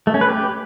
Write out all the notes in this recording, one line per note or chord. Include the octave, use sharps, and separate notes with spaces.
A3
C#4
B4
G4